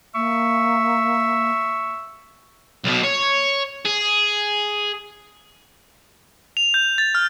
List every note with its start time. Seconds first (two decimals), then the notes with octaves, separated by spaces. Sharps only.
0.15 A#3 E5 C#6
2.85 B1 B2
3.04 C#5
3.86 G#4
6.57 F7
6.74 G6
6.98 A6
7.15 F6